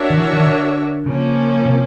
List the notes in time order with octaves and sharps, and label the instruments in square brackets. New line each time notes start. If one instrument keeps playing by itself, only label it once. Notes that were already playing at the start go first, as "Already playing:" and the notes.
Already playing: [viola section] D4 F#4 A#4 C#5 E5
[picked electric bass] D#3
E3
D#3
D3
[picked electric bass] C#3 [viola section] F3 A#3 C#4
[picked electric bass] C3